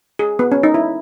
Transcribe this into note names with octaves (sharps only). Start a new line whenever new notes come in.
G#4
B3
C#4
D#4
E4